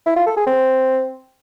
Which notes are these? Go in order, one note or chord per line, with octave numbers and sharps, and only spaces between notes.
E4
F4
A4
G#4
C4